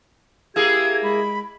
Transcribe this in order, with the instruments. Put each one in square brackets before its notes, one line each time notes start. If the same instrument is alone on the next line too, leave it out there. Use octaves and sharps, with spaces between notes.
[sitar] A#3 E4 G#4 [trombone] G4 [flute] G#6
[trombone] G#3 [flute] B5